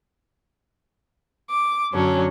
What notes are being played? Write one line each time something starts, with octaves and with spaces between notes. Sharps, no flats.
D6
F#2 D3 F#3 C#4 D4